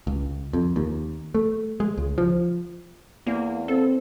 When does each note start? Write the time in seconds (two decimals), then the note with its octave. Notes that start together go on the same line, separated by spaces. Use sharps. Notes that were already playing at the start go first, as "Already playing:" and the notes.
0.07 C#2
0.53 F2
0.76 D#2
1.35 A3
1.80 G#3
1.97 C#2
2.18 F3
3.27 E2 A#3
3.68 C4 A4